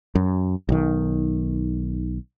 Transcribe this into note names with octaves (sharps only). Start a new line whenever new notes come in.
F#2
B1 D#3